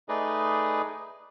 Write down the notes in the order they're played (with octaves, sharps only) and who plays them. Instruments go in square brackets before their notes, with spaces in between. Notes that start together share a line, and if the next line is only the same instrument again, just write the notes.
[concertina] A3 D#4 G#4 B4 D5 D#5